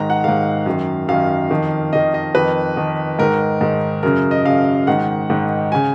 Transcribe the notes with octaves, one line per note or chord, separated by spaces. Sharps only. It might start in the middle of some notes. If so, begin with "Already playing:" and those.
Already playing: G#2 D#3 A#5
F#5
G#2 D#3 F5
F#2 D#3
F#2 D#3 F5
F2 D#3
F2 D#3 D#5
D#5
F2 D#3 B4
F2 D#3
G#2 D#3 A#4
G#2 D#3
F#2 C#3 A#4
D#5
F#2 C#3 F5
G#2 D#3 F#5
G#2 D#3
C#3 G#5